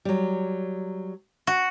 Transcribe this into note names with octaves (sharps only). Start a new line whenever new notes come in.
F#3 G3
F#4